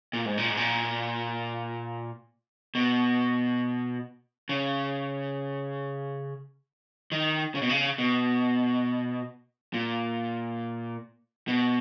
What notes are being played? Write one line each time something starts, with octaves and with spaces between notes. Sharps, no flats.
A#2
G#2
A#2
G#2
A#2
B2
C#3
D#3
C#3
B2
C#3
B2
A#2
B2